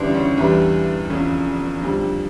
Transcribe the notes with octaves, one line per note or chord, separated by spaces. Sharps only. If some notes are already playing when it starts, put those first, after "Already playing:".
Already playing: D2 C#3 E3 G3 D4
C#4
E2 E3 G3 D4
F1 E2 C#3
F2 D3 G3